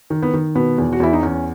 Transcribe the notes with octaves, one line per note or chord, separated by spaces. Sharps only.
D#3
B3
D#3
B2 B3
E2
F#4
E2 E4
D#4
E2 C#4